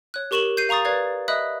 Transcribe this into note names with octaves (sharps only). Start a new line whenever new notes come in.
C#5 F#6
G4 A#4 C#6 E7 F#7 G7
G6 C7 D#7
F5 A#5 C#6 D#6 A6
B4 D5 F5 G#6
D#5 E5 B5 D#6 F#6